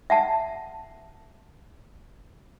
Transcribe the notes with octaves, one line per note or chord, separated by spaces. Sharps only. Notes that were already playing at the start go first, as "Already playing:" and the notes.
E5 F#5 A5